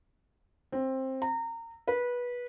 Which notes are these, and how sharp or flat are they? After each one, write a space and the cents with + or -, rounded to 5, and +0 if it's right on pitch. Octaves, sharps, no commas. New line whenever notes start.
C4 +15
A#5 -25
B4 -20